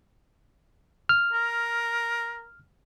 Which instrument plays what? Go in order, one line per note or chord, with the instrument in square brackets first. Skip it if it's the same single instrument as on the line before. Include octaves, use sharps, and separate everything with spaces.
[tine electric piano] F6
[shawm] A#4